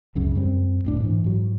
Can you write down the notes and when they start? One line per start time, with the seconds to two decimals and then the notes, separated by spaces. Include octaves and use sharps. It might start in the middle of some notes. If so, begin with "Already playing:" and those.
0.15 C#2 F#2 C#3
0.35 F#2 G3 C4
0.85 D1 A2 D4
1.00 G#2 E3
1.24 G#2 F#3